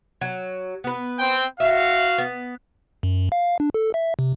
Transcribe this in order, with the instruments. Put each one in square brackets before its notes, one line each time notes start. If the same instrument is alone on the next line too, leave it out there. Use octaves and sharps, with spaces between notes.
[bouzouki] F#3
B3 B4
[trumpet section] C4 G5
[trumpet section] F#4 F5 [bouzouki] E5
[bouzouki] B3
[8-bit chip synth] F#2
F5
D4
A4
E5
C3